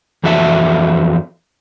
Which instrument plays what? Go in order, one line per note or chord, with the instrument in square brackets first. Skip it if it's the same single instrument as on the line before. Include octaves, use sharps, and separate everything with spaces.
[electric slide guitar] F2 E3 F#4 A4 E5 A5